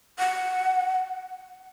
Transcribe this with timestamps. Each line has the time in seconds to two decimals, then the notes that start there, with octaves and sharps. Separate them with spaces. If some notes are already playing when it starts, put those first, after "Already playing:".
0.19 F#5